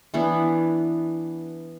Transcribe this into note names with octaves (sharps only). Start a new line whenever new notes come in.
E3 B3 D4